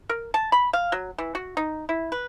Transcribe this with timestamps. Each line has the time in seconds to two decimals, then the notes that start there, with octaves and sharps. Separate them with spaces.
0.09 A#4
0.34 A5
0.52 B5
0.73 F5
0.92 F#3
1.18 E3
1.35 F#4
1.57 D#4
1.89 E4
2.12 B4